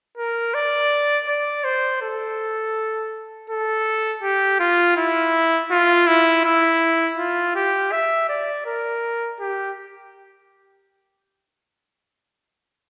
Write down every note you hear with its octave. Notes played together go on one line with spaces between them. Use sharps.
A#4
D5
D5
C5
A4
A4
G4
F4
E4
F4
E4
E4
F4
G4
E5
D5
A#4
G4